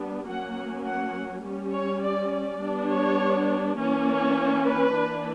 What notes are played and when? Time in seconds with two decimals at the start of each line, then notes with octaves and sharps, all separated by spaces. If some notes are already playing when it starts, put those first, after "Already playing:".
Already playing: G3 B3 D4
0.27 F#3 A#3 C#4 F#5
0.85 F#5
1.43 G3 C#4
1.72 C#5
2.01 D5
2.31 D5
2.60 G3 B3 D4
2.89 C#5
3.77 E3 A#3 C#4
4.04 C#5
4.63 B4
4.92 E3 A#3 D4